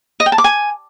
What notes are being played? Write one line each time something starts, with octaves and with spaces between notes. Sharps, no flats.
D#5
G5
A5
D6
G#5